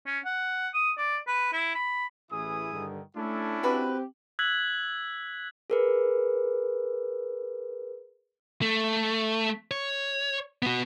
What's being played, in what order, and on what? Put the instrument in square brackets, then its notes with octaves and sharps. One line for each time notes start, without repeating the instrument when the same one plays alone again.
[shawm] C#4
F#5
D#6
D5
B4
E4
B5
[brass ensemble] A1 E3 [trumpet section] E4 G#4 D#6
[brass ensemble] G2 D3 D#3
[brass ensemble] A3 A4 [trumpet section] C#4 D4 E4
[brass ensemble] C4 G4 [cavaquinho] F#4 B4 B5
[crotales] E6 F#6 G#6 B6 F#7
[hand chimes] G#4 A#4 B4
[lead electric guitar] A3
C#5
B3 F#4